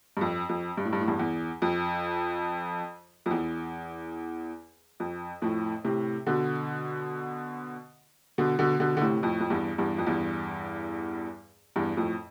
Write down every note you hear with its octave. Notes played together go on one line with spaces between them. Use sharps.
G2
F2
F2
G2
A2
G2
A2
E2 G2
E2
F2
F2
E2
F2
F2 A2
A2 C3
B2 D3
B2 D3
B2 D3
B2 D3
D3
A2 C3
F2 A2
F2
E2 G2
E2 G2
F2
E2 G2
E2 G2
F2 A2